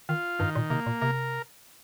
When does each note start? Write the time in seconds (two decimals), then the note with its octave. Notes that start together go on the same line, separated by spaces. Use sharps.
0.09 D#3 F4
0.39 G2 D#3
0.55 A#2
0.70 C3 A#3
0.86 A#2
1.01 C3 A#4